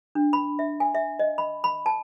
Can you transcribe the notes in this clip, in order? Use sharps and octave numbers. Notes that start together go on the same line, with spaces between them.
D4
B5
E5
G#5
E5
D#5
B5
B5
A5